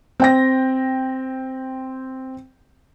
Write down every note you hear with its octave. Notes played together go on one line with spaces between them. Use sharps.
C4 G5 A#6